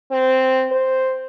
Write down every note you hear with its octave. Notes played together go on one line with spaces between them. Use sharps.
C4
C5